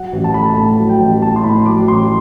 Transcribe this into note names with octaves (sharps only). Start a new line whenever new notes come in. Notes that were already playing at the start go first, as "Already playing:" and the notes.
Already playing: F#3 F#5
A1
A5
A3 B5
A5
A2 A5
F#3
G5
A1
A3 A5
C6
A2 B5
F#3 D6
A1 C6